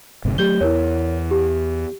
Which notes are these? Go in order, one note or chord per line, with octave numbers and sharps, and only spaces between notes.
G1 G#2 C3
F#3 G3 A3 G4 G6 G7
E2 E4 A#4 C#5
G4